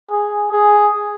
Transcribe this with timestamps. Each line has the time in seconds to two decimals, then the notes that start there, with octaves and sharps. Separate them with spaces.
0.11 G#4
0.52 G#4